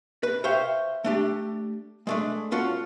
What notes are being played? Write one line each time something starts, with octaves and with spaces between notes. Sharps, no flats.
B4
C5 C#5 E5 F5 G5
A3 D4 G4
G#3 A3 D4
C#4 F4 F#4 A4